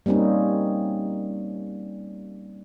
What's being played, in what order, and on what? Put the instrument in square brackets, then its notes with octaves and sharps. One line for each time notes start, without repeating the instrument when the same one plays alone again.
[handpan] G3 A#3 C4 C#4 D#4